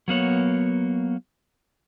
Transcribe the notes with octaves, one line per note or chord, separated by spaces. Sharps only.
F#3 A#3 B3 C#5